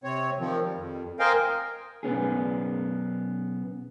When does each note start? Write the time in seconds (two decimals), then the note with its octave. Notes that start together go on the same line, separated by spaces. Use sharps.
0.04 C3 C4 C#5
0.39 D#3 F3 C4
0.62 G3
0.77 F2
1.19 A#4 C5 D#5 F5 G5 G#5
2.03 B1 B3 C#4 G#4